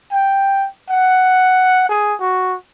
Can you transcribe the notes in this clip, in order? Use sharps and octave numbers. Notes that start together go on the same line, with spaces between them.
G5
F#5
G#4
F#4